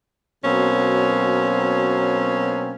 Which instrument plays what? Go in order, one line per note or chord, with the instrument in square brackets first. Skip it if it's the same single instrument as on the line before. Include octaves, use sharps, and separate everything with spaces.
[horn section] B2 F#3 A#3 C4 C#4